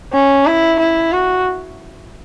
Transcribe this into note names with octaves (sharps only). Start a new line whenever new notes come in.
C#4
E4
E4
F#4